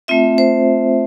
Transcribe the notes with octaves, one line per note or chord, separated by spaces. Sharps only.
A3 C4 F4 E5
C5